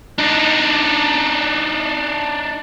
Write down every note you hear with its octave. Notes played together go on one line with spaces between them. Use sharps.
D4 D#4